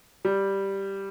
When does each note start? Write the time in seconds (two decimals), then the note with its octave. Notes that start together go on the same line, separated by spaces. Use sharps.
0.25 G3